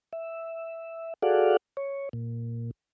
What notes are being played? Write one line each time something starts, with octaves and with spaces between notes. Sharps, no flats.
E5
F#4 G#4 A4 D5 F5 F#5
C#5
A#2